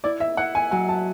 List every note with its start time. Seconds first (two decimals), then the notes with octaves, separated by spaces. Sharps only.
0.04 E4 D5
0.20 E5
0.37 E4 F#5
0.55 G#5
0.71 F#3 G#5
0.89 A5